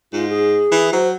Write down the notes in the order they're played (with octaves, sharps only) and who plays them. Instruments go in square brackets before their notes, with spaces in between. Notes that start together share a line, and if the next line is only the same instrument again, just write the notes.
[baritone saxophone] G#2 [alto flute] F4
[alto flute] G#4
[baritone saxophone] E3
[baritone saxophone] F#3 [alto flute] C5